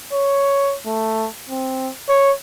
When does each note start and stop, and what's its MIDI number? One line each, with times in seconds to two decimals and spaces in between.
0.13 0.75 73
0.86 1.27 57
1.49 1.89 60
2.09 2.32 73